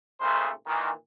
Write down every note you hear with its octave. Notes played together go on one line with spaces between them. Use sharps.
G#1 A#2 C#3 G#3 A3 C5
A#2 D#3 E3